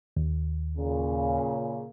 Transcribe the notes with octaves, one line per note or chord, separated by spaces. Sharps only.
D#2
A#2 C#3